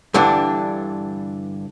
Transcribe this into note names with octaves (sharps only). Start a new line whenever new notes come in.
G2 D3 E3 D4